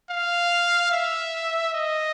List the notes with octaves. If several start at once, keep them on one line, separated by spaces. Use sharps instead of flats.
F5
E5
D#5